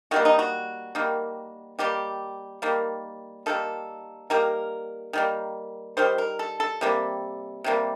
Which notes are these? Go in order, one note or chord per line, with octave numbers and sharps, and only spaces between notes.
D#3 G3 A#3 F#4
D#4
F#4
D#3 G3 A#3
D#3 G3 A#3 G4
D#3 G3 A#3
D#3 G3 A#3 A4
D#3 G3 A#3 A#4
D#3 G3 A#3
D#3 G3 C5
A#4
A4
A4
C3 G3 A#3
C3 G3 A#3